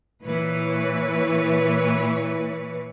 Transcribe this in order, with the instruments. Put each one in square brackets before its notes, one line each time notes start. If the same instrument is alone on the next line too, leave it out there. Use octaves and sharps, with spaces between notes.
[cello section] A#2 E3 B4 C#5